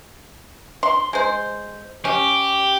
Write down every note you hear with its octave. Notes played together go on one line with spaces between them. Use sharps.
C6
G#3 C5
C#4 G4